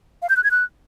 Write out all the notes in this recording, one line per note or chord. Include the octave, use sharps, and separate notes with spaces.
F5
G6
F#6
G#6
F#6